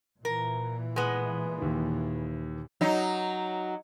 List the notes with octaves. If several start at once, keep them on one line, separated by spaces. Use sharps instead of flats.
A#2 E3 A#4
G#3 B3
D#2 D#3
F#3 D#4